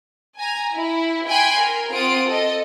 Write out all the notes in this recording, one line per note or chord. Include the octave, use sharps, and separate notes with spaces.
G#5 A#5
E4
G5 G#5 B5 C6 F#6
A#4
C4 F4 F#5 D#6 D7
A4 D#5